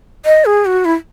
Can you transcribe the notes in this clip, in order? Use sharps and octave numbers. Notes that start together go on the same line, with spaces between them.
D#5
G#4
F#4
E4